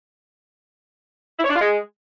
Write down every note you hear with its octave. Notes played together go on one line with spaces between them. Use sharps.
E4
C#5
D4
F4
G#3